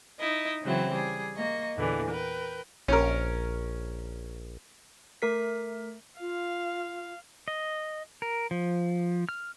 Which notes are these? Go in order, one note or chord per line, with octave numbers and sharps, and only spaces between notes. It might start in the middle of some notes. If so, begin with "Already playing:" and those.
D#4 E4 D#5
C#3 E3 F#3 C4 E4
G3 G#4
A#3 D#5 C#6
E2 A#2 D3 E3
A#4 B4 G5
A#1 C#4 A#4
A3 A#4 B6
F4 F5
D#5
A#4
F3
F6